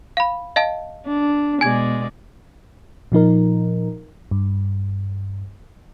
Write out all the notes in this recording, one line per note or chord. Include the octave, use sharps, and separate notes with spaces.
F5 B5
D#5 F5 A5
D4
B2 G#3 D5 G#5 G#6
A#2 F3 D#4 A#4
G2